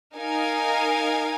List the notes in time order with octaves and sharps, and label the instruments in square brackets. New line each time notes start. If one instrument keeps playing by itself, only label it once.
[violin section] D#4 A#4 F5 G#5